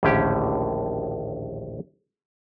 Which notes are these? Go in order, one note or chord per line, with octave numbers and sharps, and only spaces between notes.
A#1 D#2 A2 D3 C#4 G4